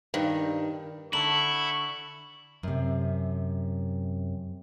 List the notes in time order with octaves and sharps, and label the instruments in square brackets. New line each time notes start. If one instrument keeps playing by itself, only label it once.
[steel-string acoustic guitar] G2 D#3
[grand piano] D3 A5 [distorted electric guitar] E4 [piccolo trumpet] C#6 [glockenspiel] F#7
[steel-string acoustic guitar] F#2 C3